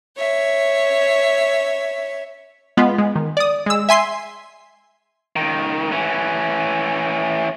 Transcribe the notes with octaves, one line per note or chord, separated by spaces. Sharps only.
C#5 E5
G#3 B3 F4
G#3
D#3
D5 D#6
G#3 E6
E5 G#5 C6 C7
C#2 D#3
E3 C#4